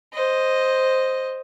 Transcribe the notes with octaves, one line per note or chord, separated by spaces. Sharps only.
C5 D#5